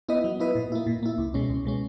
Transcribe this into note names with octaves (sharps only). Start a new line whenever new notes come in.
B3 E4 B4 D#5
F#3
B3 E4 B4 D#5
A#2
A#3 E4
A#2
A#3 E4
C#2
B2 G#3 C#4
C#2
B2 G#3 C#4